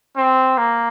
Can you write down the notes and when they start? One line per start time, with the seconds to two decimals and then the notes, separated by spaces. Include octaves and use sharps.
0.17 C4
0.58 A#3